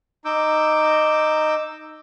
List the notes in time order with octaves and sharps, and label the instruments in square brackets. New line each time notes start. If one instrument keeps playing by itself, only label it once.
[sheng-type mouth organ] D#4 D6 E6 G6